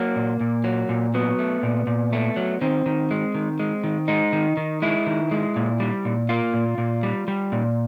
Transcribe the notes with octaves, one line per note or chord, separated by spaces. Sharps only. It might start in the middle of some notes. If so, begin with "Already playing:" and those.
Already playing: F#3 A#3
A#2
A#2
F#3
A#2
F#3 B3
A3
A#2
A#2
A3
F#3
D#3 C4
D#3
G#3
D#3
G#3
D#3
G#3 D#4
D#3
D#3
G#3 E4
D#3
G#3
A#2
G3
A#2
A#3 F4
A#2
A#2
G3
G3
A#2